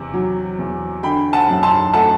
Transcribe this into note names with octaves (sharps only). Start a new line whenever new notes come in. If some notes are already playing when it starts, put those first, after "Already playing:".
Already playing: E2 C3
F#3
E2
D3 G5 B5
F#5 A5
F#2
A5 C6
A3 F#5 A5